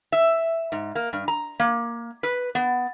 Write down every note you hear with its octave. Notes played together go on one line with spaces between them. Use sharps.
E5
G#2
A#3
G2
A#5
A#3
B4
B3